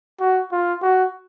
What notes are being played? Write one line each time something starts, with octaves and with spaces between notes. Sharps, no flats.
F#4
F4
F#4